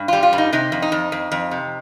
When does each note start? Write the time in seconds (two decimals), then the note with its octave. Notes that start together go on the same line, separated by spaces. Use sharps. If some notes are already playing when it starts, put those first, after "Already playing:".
Already playing: G2
0.08 G3 F4
0.23 F4
0.33 G2
0.38 D#4
0.53 C3 D#4
0.72 F2
0.82 D#4
0.92 F2
1.12 F2
1.32 F2
1.51 C3